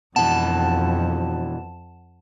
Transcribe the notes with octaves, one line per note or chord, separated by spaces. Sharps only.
F2 B2 E3 F#5 A5 E7